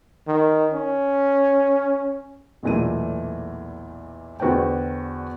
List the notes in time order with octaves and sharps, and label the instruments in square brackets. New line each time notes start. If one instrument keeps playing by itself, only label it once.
[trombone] D#3
C#4
[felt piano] B1 E2 A#2 E3 A3 D#7
E2 D3 F#4 B4 C5 G5